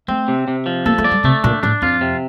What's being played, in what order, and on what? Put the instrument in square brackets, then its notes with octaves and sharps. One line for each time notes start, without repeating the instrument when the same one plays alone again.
[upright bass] A3 [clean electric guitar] C4
[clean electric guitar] C3
C3
F3
[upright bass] A#3 [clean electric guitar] A4
[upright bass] A3
[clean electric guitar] D5
[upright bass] G3
[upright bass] C3 [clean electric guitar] A3
[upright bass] A#2 [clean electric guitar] D4
[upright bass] A2 [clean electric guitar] D4
[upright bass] F2 [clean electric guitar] F4
[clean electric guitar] C3